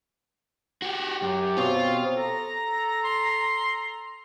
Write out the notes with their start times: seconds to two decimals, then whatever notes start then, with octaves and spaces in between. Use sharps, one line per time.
0.82 F#4 G4
1.22 F#2 G4
1.57 B2 C4 F4 C#5
2.16 A4 A#5
3.04 C6